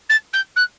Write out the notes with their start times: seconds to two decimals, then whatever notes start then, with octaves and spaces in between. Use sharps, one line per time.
0.09 A6
0.33 G6
0.56 F#6